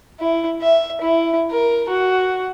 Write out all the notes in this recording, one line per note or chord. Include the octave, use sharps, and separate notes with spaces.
E4
E5
E4
A#4
F#4